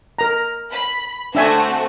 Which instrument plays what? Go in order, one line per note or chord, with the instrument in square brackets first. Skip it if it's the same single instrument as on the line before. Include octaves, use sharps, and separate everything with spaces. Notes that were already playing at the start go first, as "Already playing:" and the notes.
[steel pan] A#4 A#5
[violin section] B5
[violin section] A3 C4 F#4 [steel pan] D4 E5 G#5